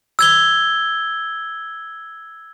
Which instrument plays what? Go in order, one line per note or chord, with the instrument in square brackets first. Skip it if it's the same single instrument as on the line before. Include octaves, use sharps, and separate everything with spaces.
[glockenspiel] E6 G#6 G7